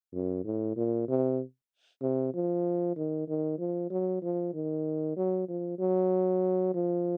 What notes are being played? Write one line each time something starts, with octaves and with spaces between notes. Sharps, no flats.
F#2
A2
A#2
C3
C3
F3
D#3
D#3
F3
F#3
F3
D#3
F#3
F3
F#3
F3